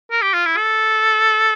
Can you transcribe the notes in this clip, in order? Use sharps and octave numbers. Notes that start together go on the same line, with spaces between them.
A#4
G4
F4
E4
A4